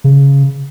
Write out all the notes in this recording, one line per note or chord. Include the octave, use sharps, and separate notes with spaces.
C#3